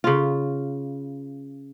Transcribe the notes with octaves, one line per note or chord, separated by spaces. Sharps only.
C#3 F4